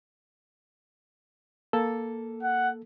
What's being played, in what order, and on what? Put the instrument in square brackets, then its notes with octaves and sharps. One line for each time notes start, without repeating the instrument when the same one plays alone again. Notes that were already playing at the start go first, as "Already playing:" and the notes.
[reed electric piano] A#3 A4
[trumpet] F#5